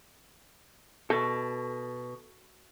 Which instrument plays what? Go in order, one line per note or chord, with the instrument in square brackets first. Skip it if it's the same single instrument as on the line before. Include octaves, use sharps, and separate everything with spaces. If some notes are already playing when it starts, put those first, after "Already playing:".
[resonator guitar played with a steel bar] B2 [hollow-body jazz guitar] A4